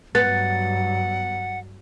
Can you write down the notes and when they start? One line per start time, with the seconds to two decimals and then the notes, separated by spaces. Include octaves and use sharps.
0.15 G2 F#3 B3 F#5 A6